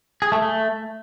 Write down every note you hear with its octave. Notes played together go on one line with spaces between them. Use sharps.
G#4
A3
A3